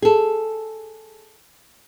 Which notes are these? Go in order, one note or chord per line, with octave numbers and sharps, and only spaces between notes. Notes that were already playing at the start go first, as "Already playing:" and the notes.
G#4 A4